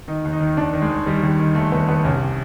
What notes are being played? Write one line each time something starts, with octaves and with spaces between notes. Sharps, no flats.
D#3 D#4
D#2
D#4
D#3
D#2 D4
D#3
G#3
D#2
D#3 G3
D#2
D#3
D#2 A3
D#2 B3
D#2 B3
C2 C#4